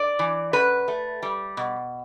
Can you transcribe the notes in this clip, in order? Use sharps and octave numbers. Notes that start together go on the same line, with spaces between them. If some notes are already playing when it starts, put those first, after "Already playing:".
Already playing: D5
E3
F#2 B4
A3
G3
B2